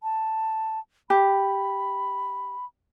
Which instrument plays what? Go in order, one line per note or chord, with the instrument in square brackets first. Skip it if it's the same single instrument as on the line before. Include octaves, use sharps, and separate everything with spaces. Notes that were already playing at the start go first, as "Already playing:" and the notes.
[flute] A5
[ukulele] G4 [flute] B5